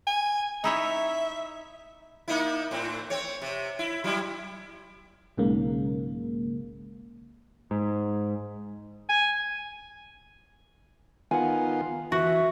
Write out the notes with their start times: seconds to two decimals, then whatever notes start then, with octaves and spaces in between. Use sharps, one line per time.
0.07 G#5
0.64 D#4 E4 C#5 E5
2.28 A#3 D#4 E4
2.71 A2 C4
3.10 C4 C#5
3.42 C3
3.79 E4
4.04 F#3 G3 E4
5.37 B1 G#2 C#3 A#3
7.71 G#2
9.09 G#5
11.31 D#3 B3 F4 F#5 G#5
12.12 E3 F#4 E5